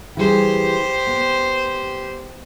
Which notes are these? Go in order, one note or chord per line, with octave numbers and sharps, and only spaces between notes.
E3 G3 G4 G#4 C5
B3